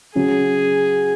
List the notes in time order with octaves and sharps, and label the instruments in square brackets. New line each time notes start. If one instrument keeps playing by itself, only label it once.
[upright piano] C#3 F#3 C#4 [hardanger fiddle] G#4